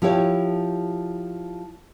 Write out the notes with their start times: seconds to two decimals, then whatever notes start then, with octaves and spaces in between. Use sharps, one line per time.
0.02 F3 E4 G4 C#5